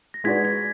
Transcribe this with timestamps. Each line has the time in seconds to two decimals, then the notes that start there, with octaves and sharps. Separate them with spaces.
0.14 A#6
0.24 G#3 D#4 F#4 B4 D5 G#6 B6
0.45 G#6 B6